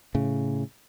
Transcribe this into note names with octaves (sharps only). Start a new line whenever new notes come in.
A2 C#3